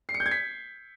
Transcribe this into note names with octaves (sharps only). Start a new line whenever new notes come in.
C7
C#7
G6
G#6
B6